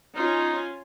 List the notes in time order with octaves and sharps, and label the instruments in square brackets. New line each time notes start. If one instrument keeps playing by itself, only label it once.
[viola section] C#4 F4 [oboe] D#4